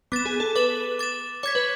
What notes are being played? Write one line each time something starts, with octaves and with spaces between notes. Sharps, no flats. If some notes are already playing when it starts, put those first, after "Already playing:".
B3 D6 A6 E7
G#4
A4
B4 D6 A6 E7
D6 A6 E7
C#5 D6 G#6 B6
B4